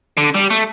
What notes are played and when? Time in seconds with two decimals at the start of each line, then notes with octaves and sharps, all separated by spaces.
0.17 D3
0.35 G3
0.50 A3